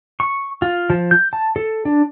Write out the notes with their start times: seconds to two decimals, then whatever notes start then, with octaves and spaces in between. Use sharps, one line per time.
0.20 C#6
0.62 F4
0.90 F3
1.11 G6
1.33 A5
1.56 A4
1.85 D4